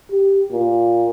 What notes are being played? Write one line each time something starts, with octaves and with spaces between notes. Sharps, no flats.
G4
A#2